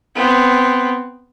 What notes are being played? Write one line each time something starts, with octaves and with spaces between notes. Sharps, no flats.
B3 C4